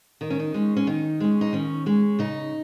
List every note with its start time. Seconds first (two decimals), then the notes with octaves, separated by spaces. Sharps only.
0.21 D#3 D#4
0.30 C#4
0.40 D#4
0.54 G#3 C#4
0.76 C#4
0.87 D#3 D#4
1.20 G#3 C#4
1.41 D#4
1.53 D#3 C#4
1.86 G#3 C#4
2.19 C#3 D#4